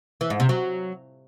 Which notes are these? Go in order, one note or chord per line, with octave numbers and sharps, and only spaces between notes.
E3
G#2
C3
F#3